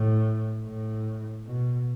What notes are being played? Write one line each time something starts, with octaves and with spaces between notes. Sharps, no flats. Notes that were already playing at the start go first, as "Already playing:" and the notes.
Already playing: A2
A2
B2